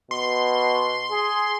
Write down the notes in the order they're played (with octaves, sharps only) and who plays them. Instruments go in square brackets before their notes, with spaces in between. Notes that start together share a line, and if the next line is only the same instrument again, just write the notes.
[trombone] B2 [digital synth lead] C6
[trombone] G#4